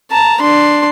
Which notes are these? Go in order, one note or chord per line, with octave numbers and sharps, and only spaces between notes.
A5 A#5
D4 C6